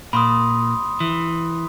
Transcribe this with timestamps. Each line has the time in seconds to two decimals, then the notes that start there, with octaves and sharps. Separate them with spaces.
0.13 A#2 B5 C6 D#6
1.00 E3